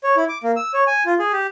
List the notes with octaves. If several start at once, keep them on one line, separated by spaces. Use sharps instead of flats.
C#5
E4
D6
A#3
E6
C#5
G#5
F4
G#4
G4